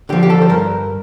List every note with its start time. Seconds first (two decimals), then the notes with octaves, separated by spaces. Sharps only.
0.09 D3 F3 G4
0.23 G4
0.30 A4
0.42 C5
0.49 G2 A#4